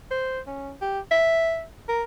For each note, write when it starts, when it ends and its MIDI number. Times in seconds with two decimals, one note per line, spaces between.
0.11 0.40 72
0.47 0.74 61
0.82 1.00 67
1.11 1.64 76
1.89 2.03 70